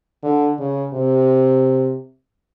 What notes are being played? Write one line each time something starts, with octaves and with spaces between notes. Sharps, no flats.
D3
C#3
C3